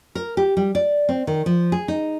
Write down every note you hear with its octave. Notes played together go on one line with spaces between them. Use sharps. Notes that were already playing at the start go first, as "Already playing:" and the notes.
A#4
G4
G3
D5
C4
D#3
F3
G#4
D#4